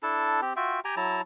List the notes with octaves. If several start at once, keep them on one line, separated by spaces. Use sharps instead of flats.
D4 E4 A4 A5
C4 G4
F4 F#4 E5 G5
G4 G5 G#5 A#5
F#3 E4 A5 A#5